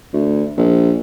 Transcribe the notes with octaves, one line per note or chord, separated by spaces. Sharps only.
D2
A#1